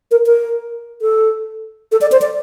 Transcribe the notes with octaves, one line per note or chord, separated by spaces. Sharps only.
A#4
A#4
A4
A4
D5
C5
D5